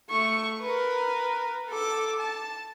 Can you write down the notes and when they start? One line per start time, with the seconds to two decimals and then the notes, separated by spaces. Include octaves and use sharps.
0.10 A3 C#6
0.61 A#4 B4
1.70 A4 D6
2.19 A5